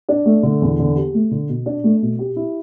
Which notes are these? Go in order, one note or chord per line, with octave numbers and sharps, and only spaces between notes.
D4
A3
D3
E2
D3
G4
A3
D3
B2
D4
A3
B2
G4
E4